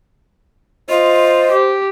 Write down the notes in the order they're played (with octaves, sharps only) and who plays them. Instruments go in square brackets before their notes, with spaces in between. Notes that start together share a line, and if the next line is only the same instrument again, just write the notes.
[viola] F4 [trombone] C5 [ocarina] D#5
[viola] G4